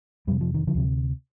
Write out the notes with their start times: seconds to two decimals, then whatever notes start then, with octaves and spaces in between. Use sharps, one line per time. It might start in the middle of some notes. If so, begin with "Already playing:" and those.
0.27 F2 C3 G3
0.41 F3
0.54 D#3
0.67 D3 F3
0.75 D2 C3